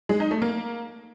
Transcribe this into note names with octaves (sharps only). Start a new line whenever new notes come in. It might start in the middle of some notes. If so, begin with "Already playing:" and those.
G#3
D#4
A3
A#3